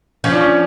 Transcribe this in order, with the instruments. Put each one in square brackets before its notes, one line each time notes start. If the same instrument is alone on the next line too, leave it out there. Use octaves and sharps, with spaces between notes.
[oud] F3 [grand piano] C#4
[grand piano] D4
C#4